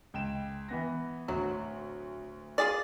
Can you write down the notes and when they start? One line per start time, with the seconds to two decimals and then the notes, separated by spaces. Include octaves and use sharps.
0.14 C#2 G5 E7
0.69 E3 B3 A#6
1.28 D1 D2 F#3
2.58 F4 G#4 D5